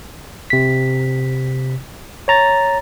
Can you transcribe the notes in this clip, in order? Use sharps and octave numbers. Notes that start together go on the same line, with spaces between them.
C3 B6
C#5 A#5 A6